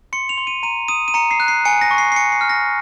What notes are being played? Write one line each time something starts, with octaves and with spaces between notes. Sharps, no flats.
C6 C#7
F7
C6
D#7
A#5 D#7
D#6 D#7
D#7
A#5 C#7
C7
F#6
C7
G#5 C#7
A#6
C#6
C7
C7
G#5 C#7
C7
F6
A#6